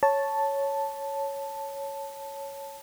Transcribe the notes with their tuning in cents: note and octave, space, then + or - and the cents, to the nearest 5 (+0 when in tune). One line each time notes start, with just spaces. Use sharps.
C#5 +0 A5 +0